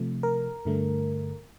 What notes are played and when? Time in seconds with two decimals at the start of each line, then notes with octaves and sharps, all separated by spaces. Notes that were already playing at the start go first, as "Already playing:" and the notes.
Already playing: C3 F3 A3
0.23 A#4
0.65 G2 D3 A3